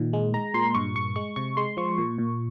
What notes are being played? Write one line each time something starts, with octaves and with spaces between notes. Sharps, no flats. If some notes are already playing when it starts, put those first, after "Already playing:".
Already playing: A#2 D#3
G#3
G#3 A#5
A#2 C6
G2 C#6
G2 C#6
G#3 C#6
C3 C#6
G#3 C6
F3 C#6
A#2
A#2